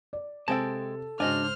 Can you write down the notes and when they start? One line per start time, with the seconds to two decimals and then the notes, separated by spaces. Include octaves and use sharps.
0.13 D5
0.48 C3 G#3 C4 A4 G5 A5
1.20 G#2 C#3 D4 F#4 C5 D#5 G#5 F6